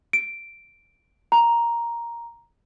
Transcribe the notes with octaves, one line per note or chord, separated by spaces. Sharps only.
D7
A#5